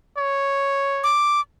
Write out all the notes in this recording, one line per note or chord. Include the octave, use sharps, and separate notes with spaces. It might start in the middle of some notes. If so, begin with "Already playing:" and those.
C#5
D6